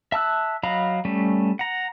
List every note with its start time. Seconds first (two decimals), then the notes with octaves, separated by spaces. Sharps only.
0.12 E5 A5 E6 F#6
0.63 F#3 D#5 F5 A#5 B5
1.05 G3 A3 C#4
1.59 F#5 A#5